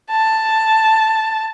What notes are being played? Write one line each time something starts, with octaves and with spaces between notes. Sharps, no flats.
A5